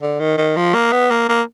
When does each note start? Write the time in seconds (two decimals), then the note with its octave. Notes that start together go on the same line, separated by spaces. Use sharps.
0.02 D3
0.20 D#3
0.38 D#3
0.57 F3
0.74 A#3
0.92 B3
1.11 A#3
1.29 A#3